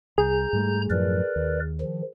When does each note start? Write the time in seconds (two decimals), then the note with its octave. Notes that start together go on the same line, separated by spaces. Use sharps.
0.18 C2 G#4 A#5 G6
0.53 G#2 G3 A3
0.90 F#2 A2 F3 A#4 B4 D5
1.36 D#2
1.81 D#3 F3